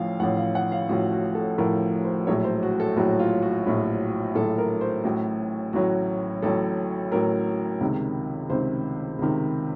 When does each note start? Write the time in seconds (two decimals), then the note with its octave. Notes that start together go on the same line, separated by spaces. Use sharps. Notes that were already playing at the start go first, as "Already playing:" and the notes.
Already playing: A1 A2 F3 F5
0.20 A1 A2 F3 F#5
0.37 F5
0.55 F#5
0.72 F5
0.89 A1 A2 F3 F#4
1.13 F#4
1.35 A4
1.58 A1 A2 F3 A#4
2.04 C5
2.27 A#1 A2 F#3 C#5
2.44 C5
2.63 F#4
2.80 A4
2.96 A#1 A2 F#3 F#4
3.19 F4
3.42 F#4
3.66 A#1 A2 F#3
4.35 A#1 A2 F#3 A4
4.58 A#4
4.81 C5
5.04 A1 A2 F#3 F#4
5.73 A1 A2 F#3 F#4
6.42 A1 A2 F#3 A4
7.12 A1 A2 F#3 A#4
7.81 C#2 C3 D#3
8.50 C#2 C3 D#3 C5
9.19 C#2 C3 D#3